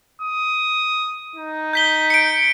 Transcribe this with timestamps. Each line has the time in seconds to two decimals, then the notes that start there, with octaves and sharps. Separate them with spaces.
0.22 D#6
1.36 D#4
1.73 G6 B6 G7
2.10 C#7 D7